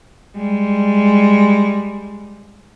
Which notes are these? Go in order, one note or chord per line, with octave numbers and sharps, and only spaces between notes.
G3 G#3